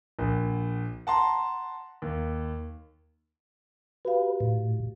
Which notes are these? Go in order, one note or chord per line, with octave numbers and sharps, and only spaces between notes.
A#1
F#5 A5 A#5 C6
D#2
F#4 G4 B4 F5
A2 F5